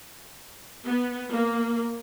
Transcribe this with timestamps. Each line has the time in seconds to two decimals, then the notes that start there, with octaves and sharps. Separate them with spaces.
0.87 B3
1.32 A#3